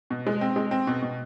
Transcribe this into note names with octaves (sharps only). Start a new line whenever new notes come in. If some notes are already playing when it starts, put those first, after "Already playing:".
B2
G#3
C4
G#3
C4
B2
B2